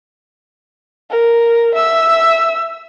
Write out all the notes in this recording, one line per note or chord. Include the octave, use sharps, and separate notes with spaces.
A#4
E5 E6